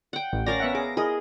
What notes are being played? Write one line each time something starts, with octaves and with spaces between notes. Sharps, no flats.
F#5 G5
A1
C#4 A#4 D5 F5 A#6
B3 E5 F#5
G#4 D6
E4 G#4 A#4 D#5